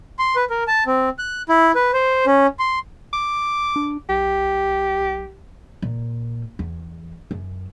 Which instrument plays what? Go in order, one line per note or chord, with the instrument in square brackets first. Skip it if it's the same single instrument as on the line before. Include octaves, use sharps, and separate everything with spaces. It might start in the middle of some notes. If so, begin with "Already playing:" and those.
[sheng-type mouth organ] C6
B4
A#4
A5
C4
F#6
E4
B4
C5
C#4
C6
[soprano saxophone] D6
[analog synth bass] D4
[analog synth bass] B1 [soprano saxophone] G4
[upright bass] A#2
E2
F#2